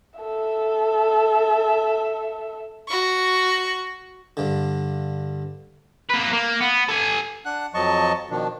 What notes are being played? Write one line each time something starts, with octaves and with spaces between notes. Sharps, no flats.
A4 E5
F#4 C#6
G2 D3
A#3 B4
A#3
B3
A4 G#5
D4 F#5 F#6
F2 F3 F#3 D#5 A5 C#6
B2 D#3 F3 D4